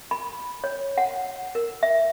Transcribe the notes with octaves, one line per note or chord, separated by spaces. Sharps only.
B5
C#5
F#5
A#4
E5